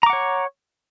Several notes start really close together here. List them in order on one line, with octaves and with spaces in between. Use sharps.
A#5 D6 F#5 C#5